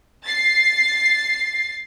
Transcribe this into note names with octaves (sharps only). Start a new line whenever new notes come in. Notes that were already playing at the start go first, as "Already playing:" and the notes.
A6 C7